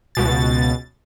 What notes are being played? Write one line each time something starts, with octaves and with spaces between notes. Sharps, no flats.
C#2 B2 A6